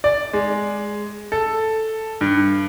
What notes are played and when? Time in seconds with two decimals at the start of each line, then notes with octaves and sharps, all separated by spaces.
0.04 D5
0.33 G#3
1.32 A4
2.21 G2